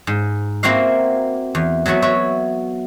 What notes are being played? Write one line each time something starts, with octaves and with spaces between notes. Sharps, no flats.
G#2
A#3 C4 E4 F#4 F5
E2
F#3 A3 B3 F#4
F#4 C#5 E5